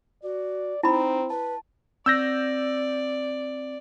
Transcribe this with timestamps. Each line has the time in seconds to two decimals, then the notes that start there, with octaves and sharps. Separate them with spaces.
0.23 F#4 D5
0.83 C4 D#4 E4 A#5 B5
1.30 B4 A5
2.06 C4 D5 E6 G6 A#6